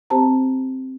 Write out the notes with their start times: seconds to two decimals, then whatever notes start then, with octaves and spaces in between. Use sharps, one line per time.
0.10 C4 G4 C5 A5 A#5